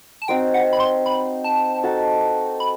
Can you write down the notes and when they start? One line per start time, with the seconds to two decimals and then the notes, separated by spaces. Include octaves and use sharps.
0.22 A5
0.28 C4 D#4 F#4 C5 G5
0.54 F#5
0.73 B5
0.80 C6
1.06 B5
1.44 A5
1.83 D#4 F#4 A4
2.60 B5